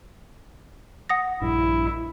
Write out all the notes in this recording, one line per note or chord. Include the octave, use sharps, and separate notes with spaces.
F#5 D#6 A#6
A#1 G2 E4